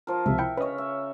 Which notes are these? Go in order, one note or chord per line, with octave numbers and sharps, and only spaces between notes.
F3 A#4
C#2 C3 F3 E5
E4 G5 C#7
C#3 B4 C#5 D#5
E5